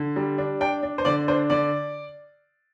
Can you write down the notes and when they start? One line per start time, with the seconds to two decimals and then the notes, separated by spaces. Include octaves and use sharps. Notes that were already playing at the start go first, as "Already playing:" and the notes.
Already playing: D3
0.16 G3
0.38 D4
0.61 D4 G5
0.83 D4
0.98 C5
1.05 D3 D5
1.28 D4 C5
1.50 D3 D5